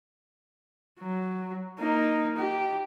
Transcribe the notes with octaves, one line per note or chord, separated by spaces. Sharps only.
F#3
A#3 D#4
G4